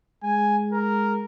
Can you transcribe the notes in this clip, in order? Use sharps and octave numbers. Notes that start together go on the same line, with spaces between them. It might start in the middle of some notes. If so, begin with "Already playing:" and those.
G#3 G#5
A#4